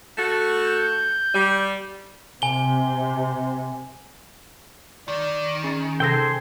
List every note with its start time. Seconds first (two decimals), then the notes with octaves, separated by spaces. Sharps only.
0.16 A3 F#4 A4
0.66 G6
1.34 G3
2.42 C3 G#5 G7
5.08 D#3 D5
5.64 C#4 G#4 A6
6.00 C3 G#4 A4 C5 G5 E6 A#6